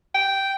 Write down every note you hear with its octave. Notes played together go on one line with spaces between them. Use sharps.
G5